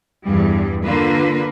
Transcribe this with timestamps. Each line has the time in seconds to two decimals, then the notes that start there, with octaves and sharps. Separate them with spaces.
0.24 E2 G2 G3
0.83 D3 A#3 F4 B4